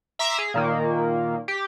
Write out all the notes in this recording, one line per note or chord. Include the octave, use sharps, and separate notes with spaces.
E5 A#5 C6 D6 E6
G#4
A#2 D#3 A#3
G4